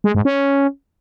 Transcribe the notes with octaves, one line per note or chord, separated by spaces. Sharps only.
G#3
G#2
C#4